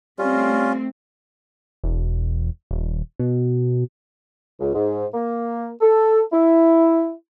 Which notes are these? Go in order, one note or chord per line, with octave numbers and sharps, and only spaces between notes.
G3 A3 C4 C#4 F4
E1
D#1
B2
C#2
G#2
A#3
A4
E4